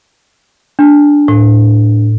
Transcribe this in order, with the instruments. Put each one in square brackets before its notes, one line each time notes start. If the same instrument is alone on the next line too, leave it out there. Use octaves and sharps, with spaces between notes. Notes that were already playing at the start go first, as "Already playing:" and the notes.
[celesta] D4
[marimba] A2